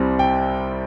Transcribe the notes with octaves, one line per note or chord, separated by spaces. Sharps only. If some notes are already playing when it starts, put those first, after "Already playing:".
Already playing: C2 C3 G3 C4
G5